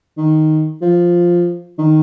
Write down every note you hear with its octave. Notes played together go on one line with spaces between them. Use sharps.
D#3
F3
D#3